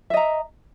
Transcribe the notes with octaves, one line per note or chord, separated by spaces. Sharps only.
D#5 E5 A#5